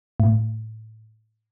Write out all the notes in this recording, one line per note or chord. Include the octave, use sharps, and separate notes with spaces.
A2